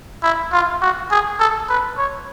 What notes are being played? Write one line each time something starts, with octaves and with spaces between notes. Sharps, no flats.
E4
F4
F#4
G#4
A4
B4
C#5